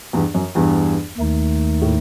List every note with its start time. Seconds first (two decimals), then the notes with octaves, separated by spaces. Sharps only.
0.13 E2 G2
0.34 F#2
0.55 E2 G2
1.18 D#2 D#3 A3 D#4
1.82 A2